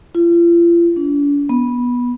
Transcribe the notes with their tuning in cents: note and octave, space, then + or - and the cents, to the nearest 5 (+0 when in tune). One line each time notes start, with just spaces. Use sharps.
F4 -40
D4 -45
B3 -15